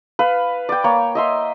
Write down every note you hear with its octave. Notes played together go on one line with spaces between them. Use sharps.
B4 F5
D5 G5
A#3 C#5
D#5 E5 C6